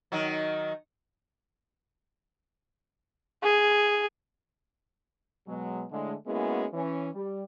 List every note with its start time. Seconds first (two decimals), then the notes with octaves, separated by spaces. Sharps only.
0.12 D#3 F#3
3.43 G#4
5.48 B2 F#3 G#3
5.91 A2 D3 G#3
6.27 G#3 A#3 B3 C#4 E4 F#4
6.73 E3 C#4
7.14 G3